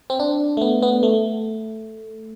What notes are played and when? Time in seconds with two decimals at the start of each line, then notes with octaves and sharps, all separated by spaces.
0.10 C4
0.20 D4
0.57 A3
0.61 B3
0.82 B3
1.03 A3